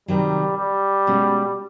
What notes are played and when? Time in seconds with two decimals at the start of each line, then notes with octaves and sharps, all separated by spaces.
0.08 C3 D#3 F#3 G3
0.57 G3
1.07 B2 G#3 C#4 F#4